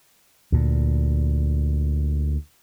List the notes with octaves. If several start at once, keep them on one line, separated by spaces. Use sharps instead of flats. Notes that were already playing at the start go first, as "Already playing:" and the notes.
D2 A#2